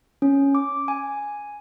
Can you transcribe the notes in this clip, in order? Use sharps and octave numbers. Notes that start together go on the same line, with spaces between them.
C#4
D6
G#5